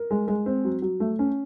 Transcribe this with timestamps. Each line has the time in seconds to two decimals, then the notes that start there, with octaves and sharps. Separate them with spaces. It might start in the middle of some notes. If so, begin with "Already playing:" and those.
Already playing: A#4
0.11 G#3
0.28 G#3
0.46 C4
0.65 F#3
0.82 F#3
1.00 A3
1.19 C#4